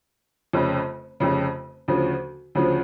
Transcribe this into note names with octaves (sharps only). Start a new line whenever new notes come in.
F1 F2 C#3
F1 F2 C#3
D2 C#3 F3
D2 C#3 F3